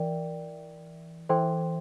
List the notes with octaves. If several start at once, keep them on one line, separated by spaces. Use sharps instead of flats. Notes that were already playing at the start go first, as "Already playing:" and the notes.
Already playing: E3 A#4 D5 G5
E3 A4 C5 G5 C6